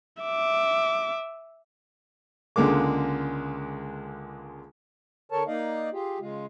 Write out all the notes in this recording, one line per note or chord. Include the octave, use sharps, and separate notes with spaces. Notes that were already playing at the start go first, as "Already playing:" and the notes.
E5 D6
C#2 D3 G#3 A#3 D6
D3 A4 A#4 C#5 A5
A#3 D#4 D5 D#5 F5
F4 G4 G#4
C#3 G#3 F4